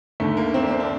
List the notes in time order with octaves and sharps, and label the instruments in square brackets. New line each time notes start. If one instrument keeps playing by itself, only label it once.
[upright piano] D#2 D3 A3
A#3
C4
D4
C4
D4